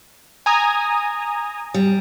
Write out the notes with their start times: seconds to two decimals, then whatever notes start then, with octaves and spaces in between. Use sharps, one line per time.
0.46 G#5 A#5 D#6
1.74 G3